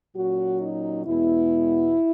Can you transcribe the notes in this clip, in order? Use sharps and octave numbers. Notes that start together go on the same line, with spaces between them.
A#2 F#3 C#4 F#4
D#4
E2 B2 G#3 B3 E4